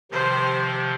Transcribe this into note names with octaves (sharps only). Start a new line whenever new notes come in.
C3 D#3 F3 G4 C5